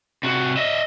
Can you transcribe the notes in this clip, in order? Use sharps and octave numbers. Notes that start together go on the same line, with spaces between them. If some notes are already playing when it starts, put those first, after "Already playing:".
C3 F#4
D#5 E5